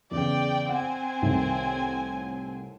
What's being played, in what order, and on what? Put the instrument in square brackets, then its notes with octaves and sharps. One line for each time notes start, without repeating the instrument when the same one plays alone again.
[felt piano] E2 C#3 [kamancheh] D5 G5
[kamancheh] C4 G#5 [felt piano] F#5
[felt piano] C2 A2 D#3